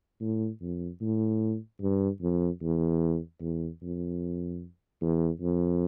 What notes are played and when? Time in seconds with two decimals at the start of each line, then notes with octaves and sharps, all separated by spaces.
0.20 A2
0.61 F2
1.01 A2
1.81 G2
2.21 F2
2.62 E2
3.41 E2
3.82 F2
5.02 E2
5.41 F2